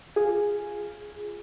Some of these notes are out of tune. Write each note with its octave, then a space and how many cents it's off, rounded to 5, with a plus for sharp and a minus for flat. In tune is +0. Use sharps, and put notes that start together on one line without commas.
F4 +0 G#4 +0